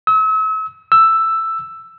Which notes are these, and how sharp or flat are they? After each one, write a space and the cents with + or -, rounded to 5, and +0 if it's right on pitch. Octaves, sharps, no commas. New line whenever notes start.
E6 -40
E6 +5